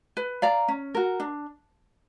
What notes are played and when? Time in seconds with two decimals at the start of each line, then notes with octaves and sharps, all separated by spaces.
0.17 B4
0.42 D5 F5 A#5
0.68 C#4
0.95 F#4 A#4
1.20 D4